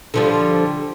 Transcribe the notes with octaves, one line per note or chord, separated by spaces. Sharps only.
D3 F3 G3